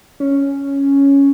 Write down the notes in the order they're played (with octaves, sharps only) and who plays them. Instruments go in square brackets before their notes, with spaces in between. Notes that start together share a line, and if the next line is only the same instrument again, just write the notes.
[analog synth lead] C#4